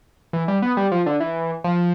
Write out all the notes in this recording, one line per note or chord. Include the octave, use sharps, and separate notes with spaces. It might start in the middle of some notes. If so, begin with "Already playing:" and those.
E3
G3
B3
G3
F3
D3
E3
F3